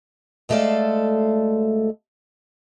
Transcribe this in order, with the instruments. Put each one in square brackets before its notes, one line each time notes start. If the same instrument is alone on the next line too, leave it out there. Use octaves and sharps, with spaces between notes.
[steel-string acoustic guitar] D2 G#3 A3 A4 D5 F5